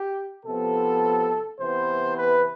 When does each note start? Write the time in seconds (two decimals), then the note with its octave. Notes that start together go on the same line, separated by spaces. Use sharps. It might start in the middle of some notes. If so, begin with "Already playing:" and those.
Already playing: G4
0.45 C3 F3 B3 A4
1.60 C3 E3 B3 C5
2.17 B4